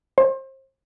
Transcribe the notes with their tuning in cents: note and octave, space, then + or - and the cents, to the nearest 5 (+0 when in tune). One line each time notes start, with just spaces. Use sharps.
C5 +35